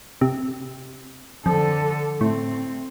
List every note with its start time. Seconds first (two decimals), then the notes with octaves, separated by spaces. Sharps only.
0.21 C3
1.46 F2 D3 A4
2.21 A2 C4